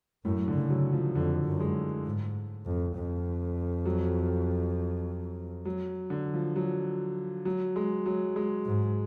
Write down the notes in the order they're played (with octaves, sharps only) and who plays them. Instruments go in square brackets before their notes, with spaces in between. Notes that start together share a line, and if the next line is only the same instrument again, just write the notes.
[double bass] F#2 [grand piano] A2
[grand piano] D3
[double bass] C#3
[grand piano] F#3
F3
[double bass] F2 [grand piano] D3
[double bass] F#2
[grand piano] G#3
[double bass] G#2
F2
F2
[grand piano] F#3
F#3
D3
F3
F#3
F#3
G#3
F#3
G#3
[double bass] G#2